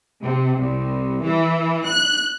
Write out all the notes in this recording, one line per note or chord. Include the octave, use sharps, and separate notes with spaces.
C3
C2
E3
F#6